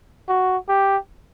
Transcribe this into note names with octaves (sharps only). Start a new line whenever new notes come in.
F#4
G4